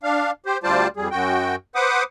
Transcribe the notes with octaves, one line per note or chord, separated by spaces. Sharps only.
D4 F5
G4 C5
D2 G3 F4 C5 D5 A5
F2 G3 G#4
F#2 F#4 G5
B4 C5 F#5 D6 D#6